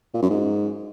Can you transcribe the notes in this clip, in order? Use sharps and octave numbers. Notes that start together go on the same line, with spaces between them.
A#2
F#2
G#2